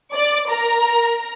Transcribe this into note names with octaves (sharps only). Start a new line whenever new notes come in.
D5 D6
A#4 A#5